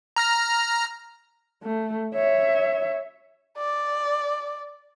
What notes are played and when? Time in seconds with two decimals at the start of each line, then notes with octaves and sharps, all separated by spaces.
0.16 A#5 F6 A#6
1.63 A3
2.14 C#5 E5
3.58 D5